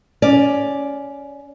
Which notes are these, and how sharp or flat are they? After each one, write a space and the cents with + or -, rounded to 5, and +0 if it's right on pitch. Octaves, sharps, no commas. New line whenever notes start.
C#4 +15 D5 +0